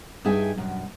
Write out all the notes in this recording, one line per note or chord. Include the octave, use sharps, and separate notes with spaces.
G2 D#4 G#4 E5 G5 G#5
F#2 B2